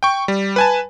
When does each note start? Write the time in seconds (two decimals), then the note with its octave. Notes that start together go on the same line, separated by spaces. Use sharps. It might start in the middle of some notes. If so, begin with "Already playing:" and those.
0.03 G5 C#6
0.28 G3
0.56 B4 G#5 A5